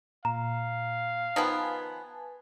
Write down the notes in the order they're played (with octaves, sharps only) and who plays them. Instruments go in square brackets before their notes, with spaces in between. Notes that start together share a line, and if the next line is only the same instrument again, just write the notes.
[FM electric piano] A#2 [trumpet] F5 [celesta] A#5
[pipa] D#3 F3 B3 [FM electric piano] B4 G#5 A5